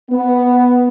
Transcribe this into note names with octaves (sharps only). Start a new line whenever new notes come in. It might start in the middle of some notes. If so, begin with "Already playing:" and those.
B3